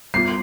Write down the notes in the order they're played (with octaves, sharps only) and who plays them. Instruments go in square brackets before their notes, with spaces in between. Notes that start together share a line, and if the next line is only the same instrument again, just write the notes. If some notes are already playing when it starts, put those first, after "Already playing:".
[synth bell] G3 B3 F4 [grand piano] C7